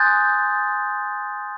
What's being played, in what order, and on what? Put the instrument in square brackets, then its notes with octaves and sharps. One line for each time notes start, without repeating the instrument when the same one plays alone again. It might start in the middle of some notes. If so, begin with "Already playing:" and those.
Already playing: [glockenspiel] G#5 C6 D#6 F#6 G6 A6